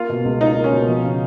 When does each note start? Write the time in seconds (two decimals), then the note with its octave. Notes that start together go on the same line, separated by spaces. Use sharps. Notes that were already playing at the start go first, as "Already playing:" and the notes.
Already playing: A#3 F4
0.09 B2
0.24 C#2
0.41 D#4 F4
0.56 A#3
0.64 C#4
0.73 B2
0.88 F3
1.04 C#3